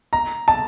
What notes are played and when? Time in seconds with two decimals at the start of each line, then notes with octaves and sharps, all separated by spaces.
0.13 A#5
0.48 A5